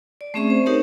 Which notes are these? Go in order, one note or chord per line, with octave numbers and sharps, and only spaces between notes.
D5
A3 C4 C#4 G#4 E5 C#6
C4 C5
D#4 G4 A#4 C#5